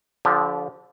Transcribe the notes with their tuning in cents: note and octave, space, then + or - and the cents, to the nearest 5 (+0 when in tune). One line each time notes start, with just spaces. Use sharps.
D3 -30 F3 +0 G4 +0